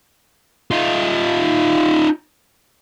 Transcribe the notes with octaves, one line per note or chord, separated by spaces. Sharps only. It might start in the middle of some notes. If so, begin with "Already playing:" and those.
D#4 F4